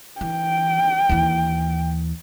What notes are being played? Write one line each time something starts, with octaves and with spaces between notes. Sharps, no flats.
E3 G5
D#2 E3